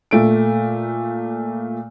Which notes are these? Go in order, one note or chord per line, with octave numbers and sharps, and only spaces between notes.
A#2 A3 D7